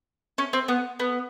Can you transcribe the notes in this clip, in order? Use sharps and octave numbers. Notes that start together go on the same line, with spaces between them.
C#4
C4
B3
B3